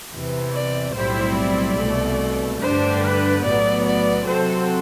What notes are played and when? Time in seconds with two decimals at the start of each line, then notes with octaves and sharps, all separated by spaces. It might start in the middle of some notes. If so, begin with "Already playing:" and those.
0.11 E2 C3 E3
0.52 D5
0.94 B1 A2 G3 C4 E4 C5
1.36 D5
1.78 C2 B2 A3
2.60 G2 D3 A3 D4 G4 C5
3.03 B4
3.43 B1 A2 F#3 B3 D5
3.86 D5
4.27 C3 F#3 C4 F#4 A4 C5